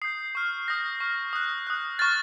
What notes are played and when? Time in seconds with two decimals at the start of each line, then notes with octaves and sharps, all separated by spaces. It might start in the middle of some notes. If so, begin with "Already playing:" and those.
0.02 D#6 G6 C7
0.35 C#6 F6
0.68 D#6 G6 A#6
1.00 C#6 F6
1.33 D#6 F#6
1.67 D#6 F#6
1.99 C#6 F6 A6